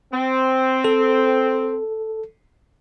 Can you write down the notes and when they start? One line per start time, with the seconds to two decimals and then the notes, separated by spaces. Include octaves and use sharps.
0.13 C4
0.84 A4